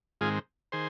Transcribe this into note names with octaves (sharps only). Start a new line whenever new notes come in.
G#2 D#3 G#3 C4 F4 G#4
D#3 G#4 C5